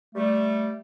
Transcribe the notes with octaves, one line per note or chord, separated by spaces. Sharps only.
G3 A3